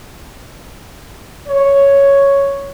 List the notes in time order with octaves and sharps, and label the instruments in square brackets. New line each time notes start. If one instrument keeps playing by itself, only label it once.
[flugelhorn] C#5